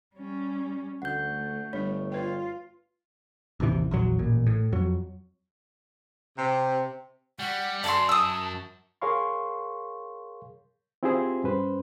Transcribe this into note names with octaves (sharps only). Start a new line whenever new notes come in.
G3 C#4
D2 A3 F#5 G6
G1 G3 D4 C#5
F4 B4 G5
A1 D#2 C3 E3
A#1 E2 F#3
A1 A#2
A2
F2 F#3
C3
G3 F#5
F#2 D5 A5 C6
D#6 E6
G#4 A#4 C#5 F5 C6 C#6
C4 E4 F4 G4 G#4 C5
G2 C#4 B4 C5